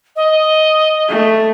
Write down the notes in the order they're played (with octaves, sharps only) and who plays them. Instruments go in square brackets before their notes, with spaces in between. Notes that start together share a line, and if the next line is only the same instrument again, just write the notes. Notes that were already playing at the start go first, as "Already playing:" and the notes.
[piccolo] D#5
[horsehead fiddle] A3